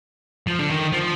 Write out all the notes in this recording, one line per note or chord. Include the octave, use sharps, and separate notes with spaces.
F3
D3
D#3
F3